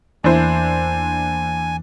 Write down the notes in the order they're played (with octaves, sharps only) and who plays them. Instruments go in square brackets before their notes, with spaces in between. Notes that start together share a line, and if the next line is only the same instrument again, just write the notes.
[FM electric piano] E2 E3 A#3 [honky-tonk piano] D4 E4 C5 [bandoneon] G#5